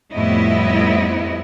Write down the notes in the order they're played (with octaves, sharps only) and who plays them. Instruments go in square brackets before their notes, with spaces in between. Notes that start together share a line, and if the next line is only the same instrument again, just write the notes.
[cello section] F2 A2 G3 B3 E4 D#5